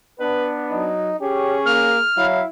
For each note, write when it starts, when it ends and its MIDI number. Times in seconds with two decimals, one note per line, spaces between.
0.20 0.91 59
0.20 0.91 62
0.20 0.51 71
0.71 1.13 54
0.71 1.19 63
1.20 1.93 61
1.20 1.57 67
1.20 2.07 68
1.66 1.98 58
1.66 2.26 89
2.17 2.40 54
2.17 2.48 64
2.17 2.43 77